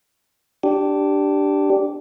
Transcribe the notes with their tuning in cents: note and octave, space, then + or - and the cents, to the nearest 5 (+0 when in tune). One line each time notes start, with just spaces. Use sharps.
D4 +0 G4 -10